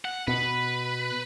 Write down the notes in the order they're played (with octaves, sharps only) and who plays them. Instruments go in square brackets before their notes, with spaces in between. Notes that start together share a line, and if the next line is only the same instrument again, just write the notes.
[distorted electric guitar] F#5
[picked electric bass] B2 [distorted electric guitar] B4